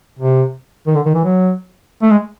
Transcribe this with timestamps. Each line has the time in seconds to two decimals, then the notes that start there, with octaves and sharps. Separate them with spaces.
0.19 C3
0.87 D#3
0.96 D3
1.06 D#3
1.15 E3
1.24 F#3
2.02 A3
2.10 G#3